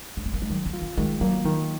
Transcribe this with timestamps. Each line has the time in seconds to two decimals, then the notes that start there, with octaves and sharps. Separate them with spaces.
0.17 C#4
0.25 C4
0.34 A#3
0.42 G#3
0.50 D#3 F#3
0.66 A#3
0.74 F4
0.82 C4
0.97 D#3 G#3
1.21 F#3 A#3
1.44 D#3 F#3